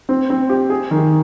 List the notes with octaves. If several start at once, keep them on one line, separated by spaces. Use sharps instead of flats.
C4
C4
G4
G#4
D#3